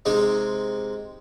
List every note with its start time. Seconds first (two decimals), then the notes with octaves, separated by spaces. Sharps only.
0.05 C3 G#3 C4 D#4